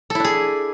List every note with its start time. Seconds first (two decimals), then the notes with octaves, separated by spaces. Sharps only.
0.10 A4
0.15 E4
0.20 D4
0.24 G#4